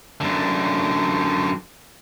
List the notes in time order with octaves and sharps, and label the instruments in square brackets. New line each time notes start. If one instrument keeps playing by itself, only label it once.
[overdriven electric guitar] F#2 D3